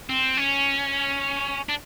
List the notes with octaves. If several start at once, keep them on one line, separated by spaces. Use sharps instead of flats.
C4
C#4
D4